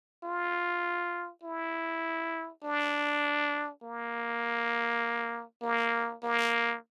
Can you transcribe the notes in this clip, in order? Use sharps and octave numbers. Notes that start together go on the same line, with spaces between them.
F4
E4
D4
A#3
A#3
A#3